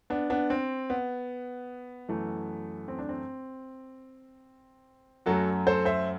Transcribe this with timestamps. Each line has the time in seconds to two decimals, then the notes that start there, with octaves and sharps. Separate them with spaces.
0.10 B3 D4
0.30 B3 D4
0.50 C4
0.90 B3
2.09 F#2 E3 A3
2.88 C4
2.99 D4
3.09 C4
5.26 F#2 F#3 A3 F#4 A4
5.67 A4 C5
5.85 C5 E5